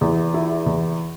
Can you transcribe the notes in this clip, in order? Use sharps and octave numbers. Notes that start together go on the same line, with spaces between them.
E2
E4
E2